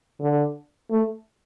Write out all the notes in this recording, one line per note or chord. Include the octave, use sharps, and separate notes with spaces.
D3
A3